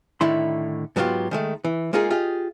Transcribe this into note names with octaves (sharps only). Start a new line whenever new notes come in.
A2 D3 D#3 E4 C6
G#2 F#3 B3 C#4 F4 G4
D#3 G#3 A3
E3
G#3 A#3 D#4 F4 G#4
F4 G4 G#4 D#5